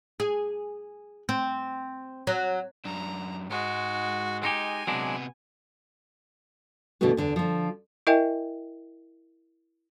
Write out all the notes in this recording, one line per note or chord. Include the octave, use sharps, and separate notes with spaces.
G#4
C4
F#3
F#2 D4 A#5
G#2 G#3 F#4
G#3 D#4 G4 G#5
C3 F#3 G#3 B3 D4
B2 D3 E3 A3 B3 F#4
E2 D3 D5
D3 F3
E4 A#4 D#5 E5 G5 G#5